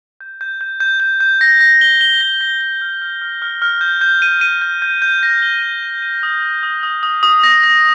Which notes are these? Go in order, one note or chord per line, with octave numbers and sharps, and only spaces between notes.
G6
G6
G6
G6
G6
G6
A#6
A#6
G7
G7
A#6
A#6
G7
F6
F6
F6
F6
F6
G6
G6
D#7
D#7
G6
G6
G6
A#6
G7
D#7
D#7
D#7
D#6
D#6
D#6
D#6
D#6
D#6
A#6
A#6